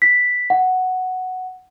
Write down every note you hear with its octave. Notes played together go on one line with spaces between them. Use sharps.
B6
F#5